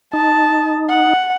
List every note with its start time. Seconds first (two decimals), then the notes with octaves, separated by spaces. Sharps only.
0.13 D#4 A5
0.90 F#5